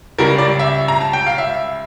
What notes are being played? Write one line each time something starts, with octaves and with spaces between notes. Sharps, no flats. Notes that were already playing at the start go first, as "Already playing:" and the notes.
C#2 C#3 G3 A#4
D5
E5
A#5
A5
G5
F5
E5